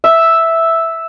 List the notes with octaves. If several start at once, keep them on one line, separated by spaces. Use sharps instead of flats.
E5